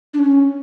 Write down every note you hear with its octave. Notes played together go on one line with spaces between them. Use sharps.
D4
C#4